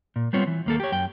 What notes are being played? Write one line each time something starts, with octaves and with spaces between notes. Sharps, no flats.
A#2
G3 B3 C4 F4 C#5
E3
D#2 A#3 A4
G4 C#5
F#2 G5